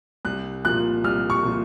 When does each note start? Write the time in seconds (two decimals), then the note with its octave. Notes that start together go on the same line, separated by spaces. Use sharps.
0.25 C2 F#6
0.65 A#2 F3 F#6
1.04 C2 F6
1.30 C#6
1.43 A#2 F3